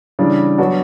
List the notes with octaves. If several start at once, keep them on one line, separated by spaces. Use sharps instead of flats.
C#3 E3 G3 D4
F#3 B3 D4 F#4